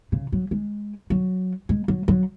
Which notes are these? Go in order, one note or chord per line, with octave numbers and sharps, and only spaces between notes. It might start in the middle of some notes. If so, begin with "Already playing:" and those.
C#3
F#3
G#3
F#3
G#3
F#3
F#3